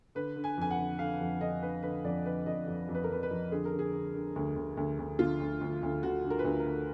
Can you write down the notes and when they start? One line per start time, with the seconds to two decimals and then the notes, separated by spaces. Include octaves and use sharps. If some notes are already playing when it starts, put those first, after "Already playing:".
0.15 D3 B4
0.36 D3
0.44 G#5
0.58 F2 G#5
0.71 F#5
0.78 D3
0.99 D3 F5
1.21 F2
1.41 D3 D#5
1.62 D3 B4
1.83 D3 B4
2.04 F2 D5
2.26 D3 B4
2.46 F2 D#5
2.68 F2
2.89 F2
2.95 B4
3.04 A#4
3.09 F2 B4
3.23 B4
3.31 F2
3.51 D3 G#4
3.65 A#4
3.72 D3
3.79 G#4
3.93 D3
4.14 D3
4.36 D2
4.56 D2
4.77 D2
4.99 D2
5.19 D3 F4
5.40 D2
5.61 D2
5.83 D2
6.03 D2 F#4
6.25 D3
6.30 A#4
6.39 B4
6.44 D2 A#4
6.60 A#4
6.66 D2